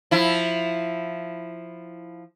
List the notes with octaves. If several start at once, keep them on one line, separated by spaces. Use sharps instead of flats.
F3 E4